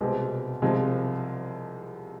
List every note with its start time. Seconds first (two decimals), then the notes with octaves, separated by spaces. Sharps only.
0.01 C2 B2 G#3 C4 G4
0.62 C2 C3 F3 G#3 C4